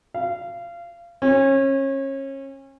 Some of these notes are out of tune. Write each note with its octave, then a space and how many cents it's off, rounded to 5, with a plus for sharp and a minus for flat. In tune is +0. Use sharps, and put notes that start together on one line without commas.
F5 -25
C#4 -30